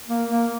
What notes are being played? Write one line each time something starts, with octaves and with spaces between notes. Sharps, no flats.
A#3
A#3